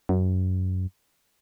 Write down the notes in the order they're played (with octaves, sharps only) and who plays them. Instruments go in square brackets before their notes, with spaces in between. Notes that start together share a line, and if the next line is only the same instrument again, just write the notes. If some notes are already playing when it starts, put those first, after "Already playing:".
[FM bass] F#2